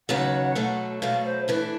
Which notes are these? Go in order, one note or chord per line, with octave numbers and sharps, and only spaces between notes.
D#2 C#3 F#3 B3 F#5
B2 F#3 A3
B2 F#3 A3 F5
C5
E3 A3 D4 B4